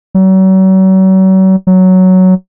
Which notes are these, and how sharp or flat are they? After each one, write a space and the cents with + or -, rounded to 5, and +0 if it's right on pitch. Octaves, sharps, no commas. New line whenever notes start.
F#3 +40
F#3 +5